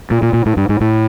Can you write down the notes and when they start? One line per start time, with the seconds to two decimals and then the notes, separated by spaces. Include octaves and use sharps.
0.11 A#2
0.22 A#2
0.33 A#2
0.46 A2
0.57 G2
0.69 G#2
0.81 A2